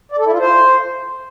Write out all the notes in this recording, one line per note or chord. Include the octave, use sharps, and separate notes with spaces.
D5
A4
E4
F4
C5